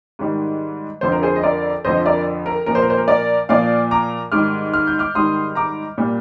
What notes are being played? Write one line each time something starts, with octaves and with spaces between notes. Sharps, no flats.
G#2 D#3 G3
F2 D3 F3 C5
A#4
G#4 C5
D#5
A#4 D5
F2 D3 F3 C5 D#5
A#4 D5
A#4
A#2 F3 A#4
C5
A#4
C5
A#4
A#4 D5
A#2 F3 D5 F5
A#5 D6
G#2 D#3 G3 D6 F6
F6
G6
D6 F6
G#2 D#3 G3 C6 D#6
A#5 D6
A#2 G3